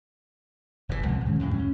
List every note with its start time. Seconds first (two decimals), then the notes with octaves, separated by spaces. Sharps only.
0.89 F1 D#2 G#2 E3
1.04 C2 C3 F3 G#3
1.26 G#2 D#3 G#3 C#4
1.39 F2 A2 C3 G#3
1.53 D2 G3 C#4